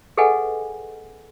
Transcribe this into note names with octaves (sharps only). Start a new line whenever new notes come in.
G#4 A4 B4 D#5 F#5 G#5